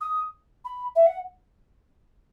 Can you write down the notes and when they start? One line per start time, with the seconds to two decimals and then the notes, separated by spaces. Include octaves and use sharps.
0.01 D#6
0.65 B5
0.96 E5
1.07 F#5